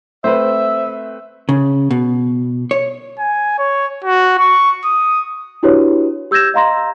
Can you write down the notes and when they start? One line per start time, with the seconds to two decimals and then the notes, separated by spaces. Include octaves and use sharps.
0.24 A3 C4 B4 C5 E5
1.49 C#3
1.91 B2
2.71 C#5
3.19 G#5
3.58 C#5
4.04 F#4
4.38 C#6
4.85 D#6
5.63 D4 E4 F#4 G4 B4 C#5
6.31 G4 E6 G6 G#6 A#6 E7
6.54 D#5 F5 A#5 C6 A#6